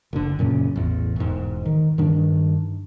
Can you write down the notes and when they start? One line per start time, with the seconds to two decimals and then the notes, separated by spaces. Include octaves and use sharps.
0.13 F#1 D3
0.39 F#2 A#2 C#3
0.76 A1 E2
1.16 E1 G#2
1.65 D#3
1.98 G2 D#3 D4